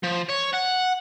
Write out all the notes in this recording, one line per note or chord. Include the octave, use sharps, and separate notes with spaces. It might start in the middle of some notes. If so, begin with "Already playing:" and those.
F3
C#5
F#5